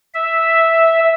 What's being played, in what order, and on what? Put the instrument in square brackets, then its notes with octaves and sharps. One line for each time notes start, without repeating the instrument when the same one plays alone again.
[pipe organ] E5